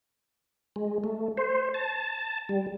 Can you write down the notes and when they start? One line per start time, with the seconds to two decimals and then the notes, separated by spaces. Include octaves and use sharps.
0.76 G#3
1.04 A3
1.37 C5
1.74 A5
2.49 G3